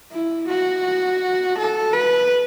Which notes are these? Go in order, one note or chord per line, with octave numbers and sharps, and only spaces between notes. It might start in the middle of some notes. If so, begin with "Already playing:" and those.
E4
F#4
A4
B4